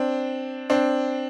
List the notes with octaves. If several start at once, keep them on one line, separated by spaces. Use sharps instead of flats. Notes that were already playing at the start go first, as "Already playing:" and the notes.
Already playing: C4 D4
C4 D4